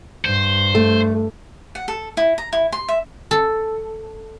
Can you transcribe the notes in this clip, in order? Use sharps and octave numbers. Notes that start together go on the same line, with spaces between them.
G2 C5
A3
F#5
A4
E4
A#5
E4
C6
E5
A4